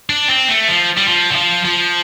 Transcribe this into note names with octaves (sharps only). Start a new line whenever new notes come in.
D4
C4
A3
F3
G3
F3
D3
F3
F3